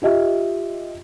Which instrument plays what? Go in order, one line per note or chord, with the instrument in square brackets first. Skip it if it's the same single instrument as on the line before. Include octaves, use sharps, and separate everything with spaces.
[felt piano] F4 G4 D#5 E5